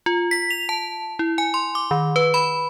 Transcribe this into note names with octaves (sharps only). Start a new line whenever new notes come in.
F4
B6
F7
A5
E4
G#5
C6
D6
D#3
B4
B5